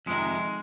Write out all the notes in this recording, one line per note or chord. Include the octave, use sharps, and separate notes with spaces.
F2 C3 D#3 G#3